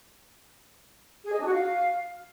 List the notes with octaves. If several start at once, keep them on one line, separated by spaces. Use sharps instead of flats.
G#4
D#5
D4
F#4
F5